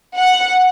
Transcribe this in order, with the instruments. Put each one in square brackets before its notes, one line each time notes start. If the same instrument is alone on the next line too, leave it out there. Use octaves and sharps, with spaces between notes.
[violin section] F#5